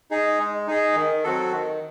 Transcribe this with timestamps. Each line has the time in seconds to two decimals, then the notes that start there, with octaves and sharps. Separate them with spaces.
0.11 D#4 G#4
0.39 G#3
0.67 D#4 G#4
0.96 D#3
1.24 F#3 C4 F#4 A4
1.52 D#3